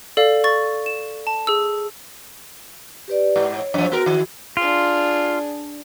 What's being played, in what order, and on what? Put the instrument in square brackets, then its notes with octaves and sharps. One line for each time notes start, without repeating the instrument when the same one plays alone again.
[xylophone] A4 D5 F5
C#6 A6
E7
A5
G#4 E6
[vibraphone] G4 B4 D5
[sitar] G#2
[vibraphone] C#5
[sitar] F#2 F3
[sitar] B3 A#4 [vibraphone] F#4
[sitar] D#3
[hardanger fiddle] D4 G#4 [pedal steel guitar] F4